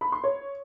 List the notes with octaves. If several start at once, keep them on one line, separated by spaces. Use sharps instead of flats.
B5
C6
C#5